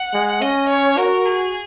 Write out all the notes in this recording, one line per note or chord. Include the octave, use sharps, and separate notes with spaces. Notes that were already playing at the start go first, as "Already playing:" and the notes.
Already playing: F#5
G#3
C#4 D#5
C#5
F#4 A#4
G#4